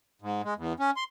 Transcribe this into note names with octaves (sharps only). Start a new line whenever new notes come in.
G#2
G#3
E2
C#4
C6